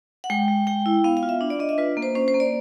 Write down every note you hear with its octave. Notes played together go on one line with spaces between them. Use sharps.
F#5
G#3 G5
G#3
G#3 G5
E4
B3 F5
F5
F4
E5
D4
D5
D4 D#5
E5
F4 B4
A#3
C5
C#4 C5
C5
A#3
D5